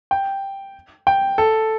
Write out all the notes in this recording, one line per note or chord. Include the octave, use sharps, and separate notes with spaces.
G5
G5
A4